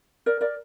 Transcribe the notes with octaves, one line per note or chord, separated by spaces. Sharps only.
A#4 D5
A#4 D5